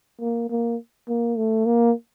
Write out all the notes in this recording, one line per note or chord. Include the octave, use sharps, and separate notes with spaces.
A#3
A#3
A#3
A3
A#3